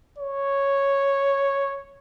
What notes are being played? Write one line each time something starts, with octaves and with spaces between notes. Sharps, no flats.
C#5